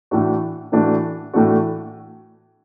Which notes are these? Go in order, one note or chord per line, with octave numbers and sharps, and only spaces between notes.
A2 E3 A3 D4 F#4
A2 E3 A3 D4 F#4
A2 E3 A3 D4 F#4